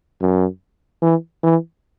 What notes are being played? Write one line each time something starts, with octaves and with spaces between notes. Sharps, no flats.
F#2
E3
E3